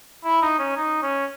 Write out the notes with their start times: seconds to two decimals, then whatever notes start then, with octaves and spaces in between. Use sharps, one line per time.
0.25 E4
0.42 D#4
0.59 C#4
0.77 D#4
1.03 C#4